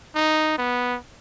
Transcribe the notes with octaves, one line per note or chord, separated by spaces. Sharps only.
D#4
B3